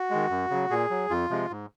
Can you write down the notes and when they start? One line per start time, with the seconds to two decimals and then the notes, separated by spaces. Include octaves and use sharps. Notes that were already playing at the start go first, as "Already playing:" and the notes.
Already playing: F#4
0.10 D#3 G#3
0.30 F#2
0.50 C#3 F#3
0.70 A#2 G#4
0.90 F#3
1.10 F2 F4
1.30 C3 F3 G#3
1.50 G#2